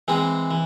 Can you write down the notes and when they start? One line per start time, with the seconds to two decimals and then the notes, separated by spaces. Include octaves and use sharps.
0.08 E3 G#3 C4 D#4
0.51 E3